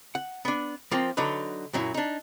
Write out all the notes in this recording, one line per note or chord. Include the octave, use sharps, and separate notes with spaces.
F#5
B3 D4
F3 A#3 C4
D3 F#3 D#4 B4
F#2 A#2 F#3 E4
D4 D#4